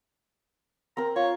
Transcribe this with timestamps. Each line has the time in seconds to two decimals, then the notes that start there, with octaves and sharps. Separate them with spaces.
0.97 C4 A#4 A#5
1.16 F4 C#5